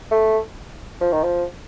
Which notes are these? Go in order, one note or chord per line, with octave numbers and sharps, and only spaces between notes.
A3
F3
D#3
F3